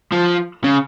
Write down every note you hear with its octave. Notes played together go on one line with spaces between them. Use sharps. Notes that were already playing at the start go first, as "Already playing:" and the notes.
F3
C#3